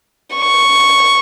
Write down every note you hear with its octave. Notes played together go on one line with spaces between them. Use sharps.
C#6